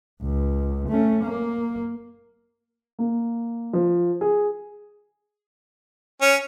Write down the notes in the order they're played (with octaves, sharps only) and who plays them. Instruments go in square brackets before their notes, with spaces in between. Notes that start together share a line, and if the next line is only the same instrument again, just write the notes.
[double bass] C#2
A3 C#4
A#3
[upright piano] A#3
F3
G#4
[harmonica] C#4